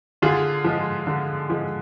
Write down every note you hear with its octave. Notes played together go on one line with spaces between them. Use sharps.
D3 F4 G#4
F3 G#3
D3
F3 G#3